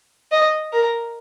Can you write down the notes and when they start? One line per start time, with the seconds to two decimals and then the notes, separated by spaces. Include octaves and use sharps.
0.32 D#5
0.73 A#4